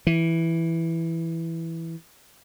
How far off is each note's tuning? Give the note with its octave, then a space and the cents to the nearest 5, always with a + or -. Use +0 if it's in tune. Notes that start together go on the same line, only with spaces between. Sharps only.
E3 +0